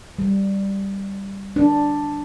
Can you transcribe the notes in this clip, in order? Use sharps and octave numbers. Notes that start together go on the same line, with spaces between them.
G3
D4